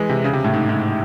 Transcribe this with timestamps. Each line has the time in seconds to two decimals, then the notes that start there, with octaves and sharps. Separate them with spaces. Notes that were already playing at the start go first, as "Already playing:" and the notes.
Already playing: E3 G#3
0.09 C3
0.24 C#3
0.33 C3
0.44 A2
0.54 G#2
0.69 G#2